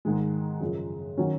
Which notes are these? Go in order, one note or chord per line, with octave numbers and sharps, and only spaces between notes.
G#2 D#3 G#3
F#2 C#3 F3
D#3 F#3 C#4